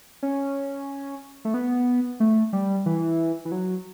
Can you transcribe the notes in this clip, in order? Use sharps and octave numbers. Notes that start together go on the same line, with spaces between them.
C#4
A3
B3
A3
G3
E3
E3
F#3